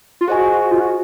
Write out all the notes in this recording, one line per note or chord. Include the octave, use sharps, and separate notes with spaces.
F4
F#4 G#4 C5 D#5 G#5
F4
F#4